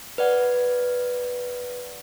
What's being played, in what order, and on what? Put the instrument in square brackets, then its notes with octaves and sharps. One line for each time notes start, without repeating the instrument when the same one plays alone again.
[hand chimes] B4 D5 F#5